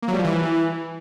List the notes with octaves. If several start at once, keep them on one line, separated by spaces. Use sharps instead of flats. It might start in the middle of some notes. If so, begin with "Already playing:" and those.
A#3
F#3
G3
F3
E3